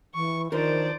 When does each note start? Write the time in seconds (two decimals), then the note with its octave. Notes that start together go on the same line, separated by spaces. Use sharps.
0.15 E3 C#6
0.52 D#3 F3 D4 A#4 C5 D5